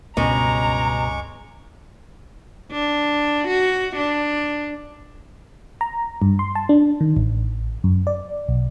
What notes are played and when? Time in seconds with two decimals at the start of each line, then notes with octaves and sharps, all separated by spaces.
0.17 C#2 G2 B2 G#3 C#4 A#5 C#6 D6
2.72 D4
3.48 F#4
3.96 D4
5.81 A#5
6.22 G2
6.39 C6
6.55 A5
6.69 D4
7.01 D#3
7.17 A1
7.84 F#2
8.07 D5
8.49 B1